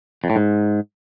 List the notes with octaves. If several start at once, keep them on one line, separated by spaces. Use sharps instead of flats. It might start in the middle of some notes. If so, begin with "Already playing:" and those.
F2
A2
G#2